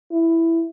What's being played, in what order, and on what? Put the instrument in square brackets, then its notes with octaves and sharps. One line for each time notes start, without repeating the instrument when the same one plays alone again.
[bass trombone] E4